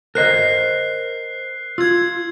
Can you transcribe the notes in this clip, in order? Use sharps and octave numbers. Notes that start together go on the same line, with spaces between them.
A#4 C5 D#5 F#6 C7
F4 E6 G#6